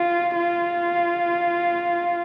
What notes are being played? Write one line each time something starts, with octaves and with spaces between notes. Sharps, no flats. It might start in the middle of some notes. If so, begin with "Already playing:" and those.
Already playing: F4
F4